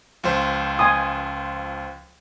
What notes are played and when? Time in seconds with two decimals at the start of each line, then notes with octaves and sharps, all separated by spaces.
0.24 C#2 F3 C5
0.79 G#5 C6 D#6